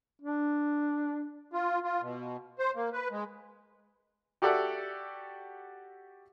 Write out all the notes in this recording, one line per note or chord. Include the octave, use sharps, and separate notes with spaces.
D4
F4
F4
B2
C5
A#3
B4
G#3
F#4 G4 A4 D5 E5 F#5